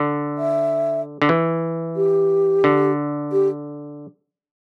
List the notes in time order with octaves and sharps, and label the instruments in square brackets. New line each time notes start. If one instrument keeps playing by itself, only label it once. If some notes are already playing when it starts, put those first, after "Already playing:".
Already playing: [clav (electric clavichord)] D3
[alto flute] E5
[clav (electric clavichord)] D3
E3
[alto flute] G4
[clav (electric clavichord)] D3
[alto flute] G4